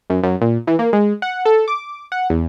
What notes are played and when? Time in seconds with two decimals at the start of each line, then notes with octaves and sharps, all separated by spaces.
0.10 F#2
0.23 F#2
0.41 A#2
0.67 E3
0.79 A#3
0.93 G#3
1.22 F#5
1.45 A4
1.68 D6
2.12 F#5
2.30 E2